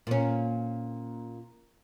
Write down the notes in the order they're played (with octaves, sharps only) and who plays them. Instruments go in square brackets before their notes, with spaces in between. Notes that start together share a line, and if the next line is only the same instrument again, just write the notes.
[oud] A#2 C#4